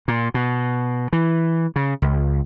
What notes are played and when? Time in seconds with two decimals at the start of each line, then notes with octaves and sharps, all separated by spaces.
0.08 A#2
0.34 B2
1.13 E3
1.76 C#3
2.02 C#2